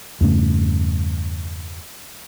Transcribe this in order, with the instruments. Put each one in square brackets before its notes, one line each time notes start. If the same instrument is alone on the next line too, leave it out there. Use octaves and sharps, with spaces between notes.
[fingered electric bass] E2 G2 C#3 A3